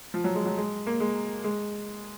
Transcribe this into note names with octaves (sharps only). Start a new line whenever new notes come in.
F3
F#3
G#3
F#3
G#3
A#3
G#3
G#3